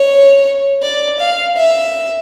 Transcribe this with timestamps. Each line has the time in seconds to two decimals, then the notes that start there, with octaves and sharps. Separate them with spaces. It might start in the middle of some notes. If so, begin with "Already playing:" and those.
Already playing: C#5
0.82 D5
1.20 F5
1.56 E5